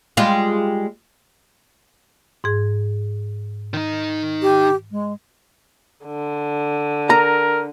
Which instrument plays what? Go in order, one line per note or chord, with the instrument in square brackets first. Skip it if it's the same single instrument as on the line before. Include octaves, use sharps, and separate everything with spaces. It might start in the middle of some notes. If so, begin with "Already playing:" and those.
[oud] G3 G#3 F4
[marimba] G#2 G#4
[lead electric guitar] D#3 D#4
[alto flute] G4
G#3
[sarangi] D3
[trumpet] A#4 [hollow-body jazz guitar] A#5